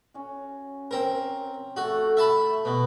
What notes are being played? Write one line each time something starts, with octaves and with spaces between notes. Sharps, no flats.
C#4 F#4
C4 A#4
A3 F#4 A4
F#4 E5 A5 B5
B2